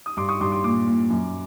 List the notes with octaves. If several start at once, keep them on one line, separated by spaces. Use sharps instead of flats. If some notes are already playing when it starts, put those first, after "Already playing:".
D#6
G2 C6 D6
C#6 D#6
G2 C6 D6
C6 D6
A#2 C6 D6
A#2
F#2